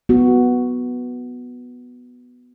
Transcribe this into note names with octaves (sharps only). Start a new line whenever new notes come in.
B3 F#4